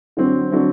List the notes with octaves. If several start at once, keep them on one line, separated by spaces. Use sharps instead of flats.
D3 F#3 C4
D3 F#3 C4